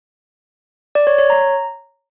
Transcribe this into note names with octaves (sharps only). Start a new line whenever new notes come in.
D5
C#5
C#5
A#5